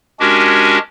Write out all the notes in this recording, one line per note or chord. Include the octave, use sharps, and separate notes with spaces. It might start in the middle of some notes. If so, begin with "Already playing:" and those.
G#3 C#4 D4 F#4 G4 A#4